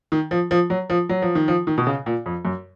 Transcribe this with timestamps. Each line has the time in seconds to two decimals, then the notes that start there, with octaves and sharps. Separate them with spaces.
0.12 D#3
0.31 F3
0.51 F3
0.70 F#3
0.90 F3
1.09 F#3
1.22 F3
1.35 D#3
1.48 F3
1.67 D#3
1.78 B2
1.87 C#3
2.06 A#2
2.26 F2
2.45 F#2